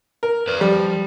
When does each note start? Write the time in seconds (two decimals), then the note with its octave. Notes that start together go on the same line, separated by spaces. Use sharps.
0.23 A#4
0.48 B4 D5
0.61 F3 G3